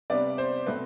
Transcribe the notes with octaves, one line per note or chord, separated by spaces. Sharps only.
C3 G3 B3 D4 D5
C5
B2 A3 C4 B4